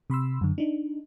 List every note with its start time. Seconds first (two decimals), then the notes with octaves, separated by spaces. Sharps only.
0.10 C3 B5 C6 E6
0.41 F#2 D3
0.58 D4 D#4